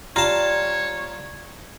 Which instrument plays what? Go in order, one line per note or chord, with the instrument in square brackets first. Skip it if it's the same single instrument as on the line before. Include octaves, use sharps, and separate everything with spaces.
[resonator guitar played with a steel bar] G3 [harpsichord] F4 A5 [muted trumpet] C#5 [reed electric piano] A#5